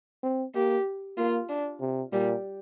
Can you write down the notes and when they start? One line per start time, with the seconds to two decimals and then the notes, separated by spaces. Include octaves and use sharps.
0.23 C4
0.55 A#3 G4
1.18 A#3 F4
1.49 D4
1.81 C3
2.12 A#2 G3